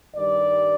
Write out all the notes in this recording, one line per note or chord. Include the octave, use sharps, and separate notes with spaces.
G2 D#3 G3 D5